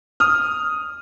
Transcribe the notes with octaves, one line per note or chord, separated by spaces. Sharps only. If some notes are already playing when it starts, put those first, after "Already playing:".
D#6 F6